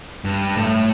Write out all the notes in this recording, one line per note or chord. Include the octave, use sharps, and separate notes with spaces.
G2
A2